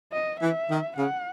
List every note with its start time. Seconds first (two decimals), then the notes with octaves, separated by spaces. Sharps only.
0.12 D#5
0.41 E3 E5
0.69 D#3
0.97 C#3 F#5